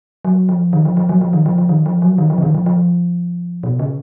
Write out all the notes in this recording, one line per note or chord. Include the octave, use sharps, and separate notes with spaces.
F#3
F3
D#3
F3
F3
F#3
F3
D#3
F3
F3
D#3
F3
F#3
D#3
F3
C#3
D#3
F3
F3
B2
C#3